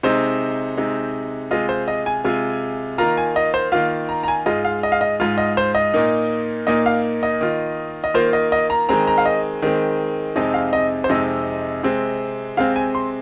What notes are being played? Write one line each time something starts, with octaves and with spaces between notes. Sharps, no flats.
C3 G#3 D#4 C5
C3 G#3 D#4
C3 G#3 F4 D#5
C5
D#5
G#5
C3 G#3 F4
D#3 A#3 F4 A#5
G#5
D#5
C5
D#3 A#3 F4 F5
A#5
A#5
G#5
G#2 G#3 F4 D#5
F5
D#5
F5
D#5
G#2 G#3 F4
D#5
C5
D#5
A#2 A#3 D#4
A#2 A#3 D#4 D#5
F5
D#5
D#3 A#3 F4
D#5
D#3 A#3 F4 C5
D#5
D#5
A#5
D#3 G#3 C4 A#5
A#5
F5
D#5
D#3 G#3 C4
F2 C3 G#3 C4 D#4 D#5
F5
D#5
C5
F2 C3 G#3 C4 D#4 D#5
C3 G#3 C4
C3 G#3 C4 F5
G#5
C6